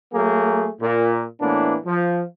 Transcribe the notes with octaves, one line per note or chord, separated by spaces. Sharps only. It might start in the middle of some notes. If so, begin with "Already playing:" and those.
F#3 A3 A#3 G#4
A#2
A2 E3 A#3 B3 D4
F3